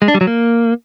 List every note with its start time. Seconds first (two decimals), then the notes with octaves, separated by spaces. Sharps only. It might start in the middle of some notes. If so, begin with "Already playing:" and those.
0.02 G#3
0.08 D4
0.14 G3
0.21 F#3
0.27 A#3